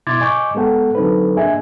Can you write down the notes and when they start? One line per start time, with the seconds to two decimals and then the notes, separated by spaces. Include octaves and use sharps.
0.07 B2 E4 C6 D6 G#6 A6
0.20 D#5 G#5 C#6 D6 G6
0.55 G#3 B3 A4 F#5 G5
0.95 D3 F#3 C4 D#4 A4 B4
1.36 A#3 D4 G#4 D#5 E5 G#5